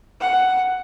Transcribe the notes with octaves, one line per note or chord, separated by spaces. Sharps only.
F#5